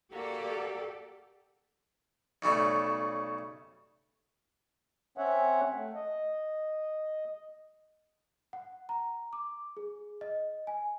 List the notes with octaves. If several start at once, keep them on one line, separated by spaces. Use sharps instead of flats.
A#3 F#4 G4 A4 D5
B1 C#3 G3 A3
C4 C#4 C#5 E5 F#5
A3
D#5
F#5
A#5
D6
G#4
D#5
G#5